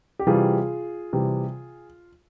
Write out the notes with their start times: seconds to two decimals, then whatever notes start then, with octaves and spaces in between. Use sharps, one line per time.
0.19 G4
0.27 C3 E3 G3 F4 G#4
1.13 C3 E3 G3